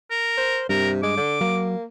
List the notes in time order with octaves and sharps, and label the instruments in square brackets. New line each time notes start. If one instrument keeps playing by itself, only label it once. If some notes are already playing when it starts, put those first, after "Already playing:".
[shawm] A#4
[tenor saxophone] C5
[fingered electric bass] G2 [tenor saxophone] C3 [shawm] A#4
[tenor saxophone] G#3 [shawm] D6
[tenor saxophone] D3
[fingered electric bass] F#3 [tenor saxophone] A#3